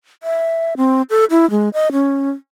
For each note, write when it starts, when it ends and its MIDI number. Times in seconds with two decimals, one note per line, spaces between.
0.23 0.74 76
0.77 1.02 60
1.10 1.25 69
1.31 1.49 64
1.51 1.69 56
1.74 1.92 75
1.92 2.30 61